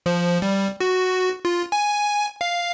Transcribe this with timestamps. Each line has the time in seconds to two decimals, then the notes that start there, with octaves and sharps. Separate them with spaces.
0.06 F3
0.42 G3
0.81 F#4
1.45 F4
1.72 G#5
2.41 F5